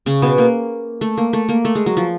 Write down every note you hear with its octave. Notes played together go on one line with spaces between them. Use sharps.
C#3 C#4
B2 B3
A#3
A3
A#3
A3
A#3
A3
G#3
F#3
F3